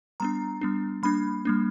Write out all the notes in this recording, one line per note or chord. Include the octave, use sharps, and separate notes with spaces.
G3 B3 D4 A#5
G3 B3 D4
G3 A#3 D4 B5
G3 A#3 D4